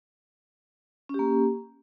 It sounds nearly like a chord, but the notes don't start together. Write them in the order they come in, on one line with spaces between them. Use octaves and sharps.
C#4 G4 A#3